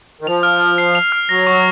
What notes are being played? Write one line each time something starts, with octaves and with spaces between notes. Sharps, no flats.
D#3
F3 F7
F6
F6
C7
F7
F6
F#3 A#6
C#6